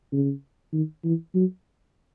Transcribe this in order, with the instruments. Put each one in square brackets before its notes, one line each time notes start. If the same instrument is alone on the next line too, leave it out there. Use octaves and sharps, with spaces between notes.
[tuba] C#3
D#3
E3
F#3